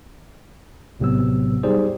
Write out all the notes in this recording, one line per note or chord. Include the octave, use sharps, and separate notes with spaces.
A#1 A2 C3 F#3 B3 E6
G3 D#4 G4 G#4 C5 D5